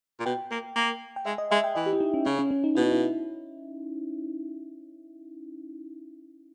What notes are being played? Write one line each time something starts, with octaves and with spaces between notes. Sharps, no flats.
A#2
B2 G5
A#3
A#3
G5
G#3 E5
D#5
G#3 E5
G5
E3 D#5
G4
E4
D#4
C#4
C#3 C#4
C#4
C#4
D#4
B2 E4
D#4
E4